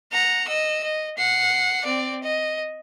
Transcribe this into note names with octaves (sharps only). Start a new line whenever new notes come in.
F#5 A#5
D#5 E6
D#5
F#5 C7
C4 D5
D#5